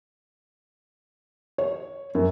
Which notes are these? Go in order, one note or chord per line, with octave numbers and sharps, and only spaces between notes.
C#5
F#2